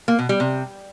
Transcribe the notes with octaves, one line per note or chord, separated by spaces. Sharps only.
A#3
B2
G3
C3